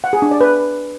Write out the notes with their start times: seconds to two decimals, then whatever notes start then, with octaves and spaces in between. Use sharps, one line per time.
0.04 F#5
0.13 G#4
0.22 D4
0.31 D5
0.41 B4